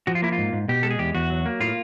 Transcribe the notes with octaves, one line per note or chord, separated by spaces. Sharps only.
F3 F#4
F4
A#3 E4
F4
G#2
G#2
B2 G4
G#3 A4
G#4
E2 G4
E2 F#4
F#3
A#3
A2 F4